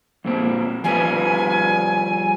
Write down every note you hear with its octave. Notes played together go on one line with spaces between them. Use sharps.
F2 A#2 C4
F3 G3 B4 G#5